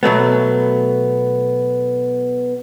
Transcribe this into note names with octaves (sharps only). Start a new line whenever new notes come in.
B2 F#3 A3 B3